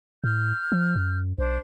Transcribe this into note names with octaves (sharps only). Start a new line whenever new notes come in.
A2 F6 G6
F3
F#2
B1 D4 C5